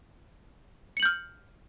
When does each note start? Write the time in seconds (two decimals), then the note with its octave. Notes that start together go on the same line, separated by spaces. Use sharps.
0.97 C#7
1.00 F#7
1.03 G6
1.05 F6